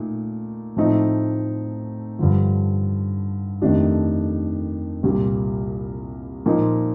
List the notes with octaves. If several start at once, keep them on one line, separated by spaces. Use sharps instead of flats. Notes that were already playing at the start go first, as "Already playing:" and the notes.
Already playing: A#2 A3 D#4
A2 F3 A3 C4 D#4
G2 D3 F3
F2 D#3 A3 D4 G4
C2 A#2 G3
A#2 F3 A#3 D#4